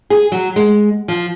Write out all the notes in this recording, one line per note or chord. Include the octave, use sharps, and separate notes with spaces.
G#4
F#3
G#3
F3